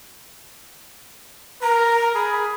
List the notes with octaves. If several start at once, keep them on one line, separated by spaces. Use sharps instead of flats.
A#4 A#5
G#4 B5